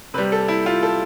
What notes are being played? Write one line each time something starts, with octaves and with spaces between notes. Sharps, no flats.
C3 G3 B4
A4
E4
F4
A4